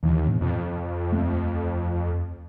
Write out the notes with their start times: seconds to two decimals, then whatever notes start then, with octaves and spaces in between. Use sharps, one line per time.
0.03 D#2 D#3 E3
0.27 A2 B3 D4
0.41 F2 C3
1.11 D#1 A3 C4